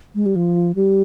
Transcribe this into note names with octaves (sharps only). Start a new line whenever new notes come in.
G#3
G3
F3
G3